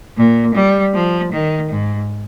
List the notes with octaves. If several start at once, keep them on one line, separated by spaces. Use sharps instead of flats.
A#2
G3
F3
D#3
G#2